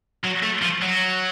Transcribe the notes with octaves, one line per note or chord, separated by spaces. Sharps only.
F#3
A3
F3
F#3